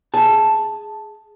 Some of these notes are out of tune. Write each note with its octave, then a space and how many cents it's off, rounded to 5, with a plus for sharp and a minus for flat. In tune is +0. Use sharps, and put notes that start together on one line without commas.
G#4 +0 A5 +0